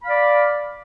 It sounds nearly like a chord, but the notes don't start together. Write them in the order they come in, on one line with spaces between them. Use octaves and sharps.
B5 F5 D5